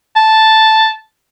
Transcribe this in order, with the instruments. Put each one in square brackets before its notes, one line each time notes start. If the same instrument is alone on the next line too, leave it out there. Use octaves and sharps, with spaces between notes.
[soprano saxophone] A5